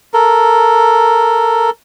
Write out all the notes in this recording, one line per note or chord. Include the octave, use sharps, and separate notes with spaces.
A4 A#4